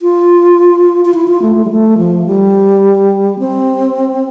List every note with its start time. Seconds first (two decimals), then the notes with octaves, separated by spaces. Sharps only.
0.02 F4
1.05 F4
1.14 E4
1.28 F4
1.42 A3
1.56 A3
1.65 G3
1.70 A3
1.98 F3
2.26 G3
3.39 C4